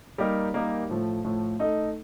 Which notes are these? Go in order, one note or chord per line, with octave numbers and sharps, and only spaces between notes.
G3 A#3 D#4 G4 A#4
G3 A#3 D#4 G4 A#4
A2 F3 A3
A2 F3 A3
A3 D#4 A4 D#5